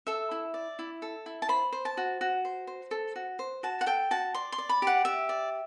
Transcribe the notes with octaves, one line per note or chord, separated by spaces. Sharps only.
A4 E5
E4
D5
E4
A4
E4
A5
C5 B5
C5
A5
F#4
F#4
C5
C5
A4
F#4
C5
F#4 A5
F#5
A4 G5
F#4 A5
D5 C6
C6
D5
B5
G4 F#5
G4 E5
D5